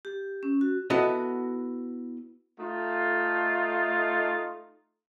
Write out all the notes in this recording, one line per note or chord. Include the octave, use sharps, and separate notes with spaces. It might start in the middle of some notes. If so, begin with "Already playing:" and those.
G4
C#4
F#4
B3 E4 F#4 A4 D#5
A3 D#4 F4